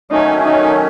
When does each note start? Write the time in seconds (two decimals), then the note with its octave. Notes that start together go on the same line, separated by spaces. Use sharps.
0.11 D#3 F#3 A3 C#4 D#4
0.44 D#4